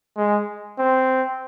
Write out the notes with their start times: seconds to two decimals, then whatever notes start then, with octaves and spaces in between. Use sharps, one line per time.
0.17 G#3
0.79 C4